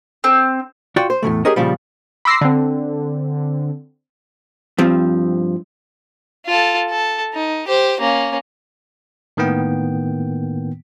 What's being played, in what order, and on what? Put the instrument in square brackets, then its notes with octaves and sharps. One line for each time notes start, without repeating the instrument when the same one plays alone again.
[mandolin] C4
[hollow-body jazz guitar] F4 F#4 D5 F#5 G5
C5
E2 A2 C#3 A3
G4 G#4 A#4 C#5 D#5
A#2 C#3 F3 G3
[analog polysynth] B5 C6 D6 E6 A#6 C7
D3 C4
[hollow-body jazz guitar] G2 F3 C4
[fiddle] F4 A4
A4
D#4
G4 C5
A#3 C#4
[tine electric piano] A2 D#3 A#3 B3 G5